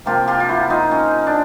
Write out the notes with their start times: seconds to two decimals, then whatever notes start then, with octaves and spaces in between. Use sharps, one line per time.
0.06 C3 F3 A#3 F4 G4
0.28 F4 G4
0.40 F4
0.49 E4 F#4
0.70 D#4 F4
0.91 C#4
1.27 D4